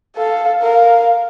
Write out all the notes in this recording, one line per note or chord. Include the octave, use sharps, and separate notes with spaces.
A4 F5
A#4 F5